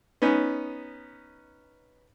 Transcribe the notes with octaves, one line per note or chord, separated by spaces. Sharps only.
B3 C#4 D#4